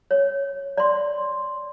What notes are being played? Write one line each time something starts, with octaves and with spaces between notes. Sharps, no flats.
C#5
D5 C6